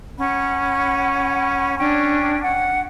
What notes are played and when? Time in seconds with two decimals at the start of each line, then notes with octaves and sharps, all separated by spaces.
0.18 C#4 F#5 B5
1.78 C#4 D4 G5
2.42 F#5